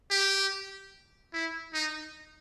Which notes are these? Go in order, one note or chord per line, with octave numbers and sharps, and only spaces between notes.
G4
E4
D#4